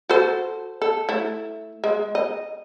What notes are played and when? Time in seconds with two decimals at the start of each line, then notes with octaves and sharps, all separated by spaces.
0.10 F#4 A4 C5
0.82 A4
1.09 A3 E4
1.84 G#3
2.15 D#5